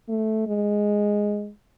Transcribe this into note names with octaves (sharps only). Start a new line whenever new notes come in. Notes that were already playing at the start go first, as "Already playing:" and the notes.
A3
G#3